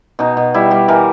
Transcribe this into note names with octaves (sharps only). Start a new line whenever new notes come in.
B2 D#4
B2
G3 E4
G3 G4
E3 A#4